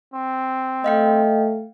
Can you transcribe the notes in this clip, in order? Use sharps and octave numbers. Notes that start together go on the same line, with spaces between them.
C4
A3 D#5 F5 G5